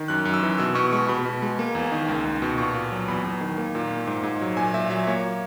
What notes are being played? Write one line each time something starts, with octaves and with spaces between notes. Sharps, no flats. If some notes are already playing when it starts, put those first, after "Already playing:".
Already playing: D#3
F#2 F#6
F#2
E6
E3
B2 E6
B2 C#6
G#3 C#6
B2 B5
B2
G#3
A#3
E2
D#3
C#2
C#2
B2
A#2 C#6
A#2
F#3
E2 B5
E2
D#3
A#3
A#2
A#3
G#2
G#2
F#3
A#2 G#5
A#2 E5
F#3 E5
A#3 C#5